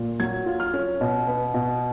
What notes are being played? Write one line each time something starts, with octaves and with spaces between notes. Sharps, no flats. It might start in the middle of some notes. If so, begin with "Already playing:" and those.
Already playing: A#2
F#3 G#6
F4
F6
C#4
B2
B3
B2